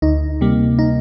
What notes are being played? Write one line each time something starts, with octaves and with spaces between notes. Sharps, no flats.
D2 D#4
C3 G3 A#3
D#4